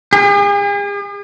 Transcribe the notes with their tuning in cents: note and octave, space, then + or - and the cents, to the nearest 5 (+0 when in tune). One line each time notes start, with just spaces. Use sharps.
G#4 -45